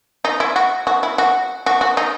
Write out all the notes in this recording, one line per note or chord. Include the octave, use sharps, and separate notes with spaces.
D#4
E4
F#4
F#4
E4
F#4
F#4
F#4
D#4